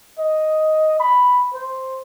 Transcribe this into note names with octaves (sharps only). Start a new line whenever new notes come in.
D#5
B5
C5